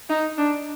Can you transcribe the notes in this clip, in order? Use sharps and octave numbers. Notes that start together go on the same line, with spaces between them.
D#4
D4